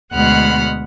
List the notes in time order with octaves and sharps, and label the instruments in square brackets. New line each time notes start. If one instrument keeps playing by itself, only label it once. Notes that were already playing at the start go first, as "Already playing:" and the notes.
[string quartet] D2 B2 G#3 F#5 B5 F6